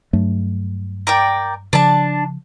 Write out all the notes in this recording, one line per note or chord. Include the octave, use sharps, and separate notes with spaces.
G2 F#3 A3
A#4 D5 G5
C#3 F3 D4 A5